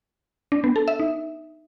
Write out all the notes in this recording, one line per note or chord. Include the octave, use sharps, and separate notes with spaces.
D4
B3
A4
E5
D#4